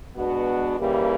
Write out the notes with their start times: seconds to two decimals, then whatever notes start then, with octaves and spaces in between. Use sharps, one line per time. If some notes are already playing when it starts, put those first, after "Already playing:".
0.16 B2 G#3 B3 D4 F#4
0.79 D#2 C#3 E3 G3 A#3